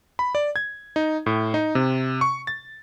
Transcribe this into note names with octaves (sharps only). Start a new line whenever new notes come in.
B5
D5
G#6
D#4
A2
D#4
C3
C#6
A6